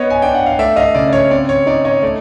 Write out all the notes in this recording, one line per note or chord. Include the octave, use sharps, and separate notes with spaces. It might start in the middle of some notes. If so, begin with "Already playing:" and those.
Already playing: B3 C#5 D#5
G#5
D4 G5
F#5
F5
A3 D5 E5
D#5 F5
C#3 D5
D5
C#5
C4 D5
C#5
D#4 D5
C#5 D#5
A3 D5